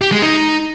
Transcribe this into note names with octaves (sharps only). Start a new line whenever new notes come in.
G4
G#3
D#4